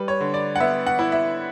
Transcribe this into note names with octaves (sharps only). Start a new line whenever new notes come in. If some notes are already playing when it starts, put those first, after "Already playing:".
Already playing: G3 B4
C#5
D3
D5
F#5
B3 E5
F#5
E4
E5